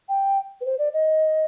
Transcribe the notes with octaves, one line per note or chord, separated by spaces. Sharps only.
G5
B4
C5
D5
D#5